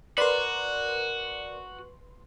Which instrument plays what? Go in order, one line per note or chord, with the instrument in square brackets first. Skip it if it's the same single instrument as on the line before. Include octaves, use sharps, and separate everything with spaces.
[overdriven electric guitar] F#4 [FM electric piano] A#4 D5 [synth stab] B4 C6